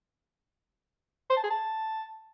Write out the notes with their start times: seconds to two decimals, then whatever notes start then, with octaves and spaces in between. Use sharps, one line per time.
1.30 C5
1.37 A5
1.44 G#4
1.50 A5